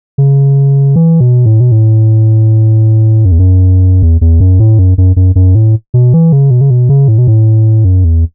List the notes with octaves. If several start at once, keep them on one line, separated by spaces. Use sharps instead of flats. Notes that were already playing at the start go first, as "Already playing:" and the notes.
C#3
E3
B2
A2
B2
A2
F#2
E2
F#2
E2
E2
F#2
A2
F#2
F#2
F#2
F#2
A2
B2
E3
C#3
B2
C#3
B2
C#3
A2
B2
A2
F#2
E2